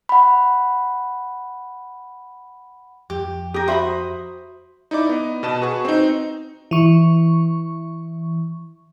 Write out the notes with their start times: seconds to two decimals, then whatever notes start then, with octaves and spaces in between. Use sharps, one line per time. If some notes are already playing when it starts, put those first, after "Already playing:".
0.09 F#5 B5
3.10 F2 G4
3.54 G4 A#4 D#6
3.68 F#4 C5 E5 B5 D#6
4.91 D#4 E4 D5 D6
5.09 B3 D#5
5.43 B2 B4 D#5 A5 E7
5.61 F#4 G#4 B4 C#6
5.85 C4 D#4
6.71 E3 C#6